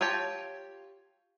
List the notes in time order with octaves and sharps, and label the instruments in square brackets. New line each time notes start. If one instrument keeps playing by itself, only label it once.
[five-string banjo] F4 G4 C#5 A5